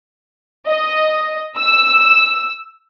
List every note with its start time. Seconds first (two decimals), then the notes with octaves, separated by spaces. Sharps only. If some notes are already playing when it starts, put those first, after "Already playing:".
0.67 D#5
1.58 E6